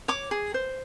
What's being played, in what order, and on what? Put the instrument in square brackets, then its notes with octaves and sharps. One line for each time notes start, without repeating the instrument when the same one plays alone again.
[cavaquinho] C#5 D6
G#4
C5